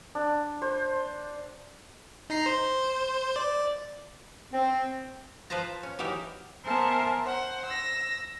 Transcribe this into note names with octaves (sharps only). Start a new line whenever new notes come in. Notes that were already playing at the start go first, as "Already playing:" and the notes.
D4
C5
D#4 A#5 C7
C5
D5
C4
F3 B4 C5 A5 A#5
C#4
E3 F#3 D#4 G4 A#4
B3 A#4 C5 E5 G#5 A5
C5 F#5
E6 A#6